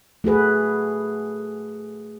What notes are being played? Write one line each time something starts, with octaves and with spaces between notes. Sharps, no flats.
A3 F#4 G#4 B4